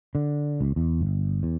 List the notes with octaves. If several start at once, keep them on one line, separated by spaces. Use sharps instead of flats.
D3
C#2
E2
G1
E2